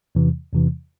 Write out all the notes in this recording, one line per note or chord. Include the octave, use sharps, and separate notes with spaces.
E2 C3 E3
E2 C3 E3